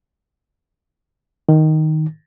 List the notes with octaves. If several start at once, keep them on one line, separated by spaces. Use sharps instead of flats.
D#3